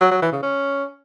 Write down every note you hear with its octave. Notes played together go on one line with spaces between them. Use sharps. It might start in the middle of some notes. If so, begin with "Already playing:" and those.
F#3
F#3
E3
C#3
C#4